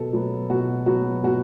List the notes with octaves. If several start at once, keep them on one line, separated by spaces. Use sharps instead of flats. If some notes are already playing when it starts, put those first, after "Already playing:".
Already playing: B2 F#3 B3 A4
F#3 B3
B2 F#4
F#3 B3 F#4
B2 F#4